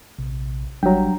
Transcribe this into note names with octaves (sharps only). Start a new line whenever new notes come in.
A#1 C3
G#1 F#3 G3 D4 G5 A#5